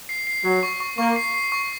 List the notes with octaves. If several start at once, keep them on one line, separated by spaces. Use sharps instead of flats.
C7
C7
F#3 C7
C#6
C#6
A#3 C#6
C7
C7
C#6